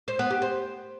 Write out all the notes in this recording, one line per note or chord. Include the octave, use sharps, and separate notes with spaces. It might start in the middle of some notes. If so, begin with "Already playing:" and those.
C5
B3
G4
C5